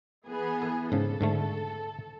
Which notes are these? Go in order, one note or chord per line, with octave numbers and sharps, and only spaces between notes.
E3 B3 G#4
A4
G#2 C#3 A4
G#2 D3 A3